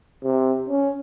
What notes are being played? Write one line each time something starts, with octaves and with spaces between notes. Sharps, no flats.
C3
C#4